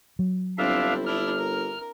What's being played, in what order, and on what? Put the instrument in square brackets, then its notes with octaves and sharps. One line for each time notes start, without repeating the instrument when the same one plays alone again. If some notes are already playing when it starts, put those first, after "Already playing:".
[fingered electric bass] F#3
[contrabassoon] G1 [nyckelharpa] C4 E4 [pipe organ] D4 E5 F5
[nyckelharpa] D4 E4 [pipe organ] F6
[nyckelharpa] A#4